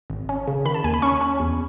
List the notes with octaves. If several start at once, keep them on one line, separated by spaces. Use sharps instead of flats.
G#1
C#4
C#3
D#3 B5
A5
D#2 G#5
B5
C#4 C#6
C#4
E2